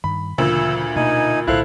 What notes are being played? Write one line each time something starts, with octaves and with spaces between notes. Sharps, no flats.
G2 D#3 B5
D2 A#2 C#3 E3 E6
B2 A3 A#3 D#4 G#5
B1 A2 D3 E4 A4 C5 F5 F#6